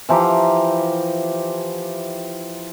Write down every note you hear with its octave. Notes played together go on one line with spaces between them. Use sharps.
E3 F3 G4 A#5